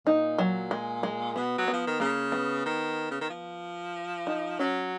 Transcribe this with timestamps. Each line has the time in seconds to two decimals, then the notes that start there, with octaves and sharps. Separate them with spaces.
0.06 A#2 D#4
0.38 F#3
0.71 G#3
1.03 G#3
1.36 B2 B3
1.58 F#3
1.68 B3
1.73 F3
1.87 D#3
2.00 C#3 A#3
2.32 B3
2.66 D#3
3.11 C#3
3.21 D#3
3.30 F3
4.27 D#4
4.59 F#3 C#4